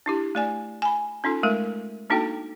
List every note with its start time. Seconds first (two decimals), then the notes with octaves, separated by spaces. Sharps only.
0.06 D4 E4 G4
0.35 A3 D5 G#5
0.82 G#5 B5
1.24 C#4 D#4 F4 A4
1.43 G#3 A3 A#4
2.10 A#3 D4 D#4 F#4 A4 G5